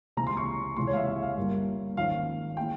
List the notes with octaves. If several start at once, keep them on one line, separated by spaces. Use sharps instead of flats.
C#2 C3 E3 A#5
C6
C#6
C#2 C3 E3 G#3 C6
C#5
F5
E5
F5
F5
G1 G2 G3 A#3
G#1 G#2 F3 A#3 C#4 F5
E3 G#3 G5